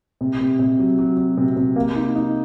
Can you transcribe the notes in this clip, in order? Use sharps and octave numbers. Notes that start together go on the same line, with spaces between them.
C3
C3
C3
F#3
F#3
F#3
C3
C3
A#3
D#4
D#4